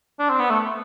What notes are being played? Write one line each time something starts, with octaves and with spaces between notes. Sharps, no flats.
D4
C4
B3
A3